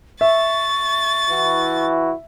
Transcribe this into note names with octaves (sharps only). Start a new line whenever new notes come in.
E5 C#6 A6
E3 E4 F#4